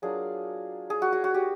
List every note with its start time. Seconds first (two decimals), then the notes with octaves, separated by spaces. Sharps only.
0.02 F#3 A#3 D4 F4 G#4
0.90 G#4
1.02 F#4
1.13 F#4
1.24 F#4
1.34 G4